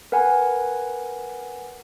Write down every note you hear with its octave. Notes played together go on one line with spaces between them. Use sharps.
A#4 B4 F#5 G#5